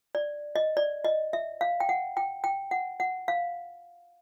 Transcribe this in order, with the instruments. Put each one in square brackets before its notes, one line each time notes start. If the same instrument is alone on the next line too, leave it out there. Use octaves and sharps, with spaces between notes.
[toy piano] D5
D#5
D5
D#5
E5
F5
G5
F#5
G5
G5
F#5
F#5
F5